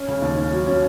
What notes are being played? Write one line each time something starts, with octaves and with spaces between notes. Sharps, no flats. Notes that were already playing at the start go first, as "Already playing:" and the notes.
Already playing: C#4
C#3
D#2
C#4
F#3
C#4